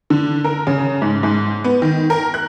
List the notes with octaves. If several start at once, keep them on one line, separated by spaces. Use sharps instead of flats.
D3
A#4
C#3
G#2
G#2
B3
D#3
A#4
F#6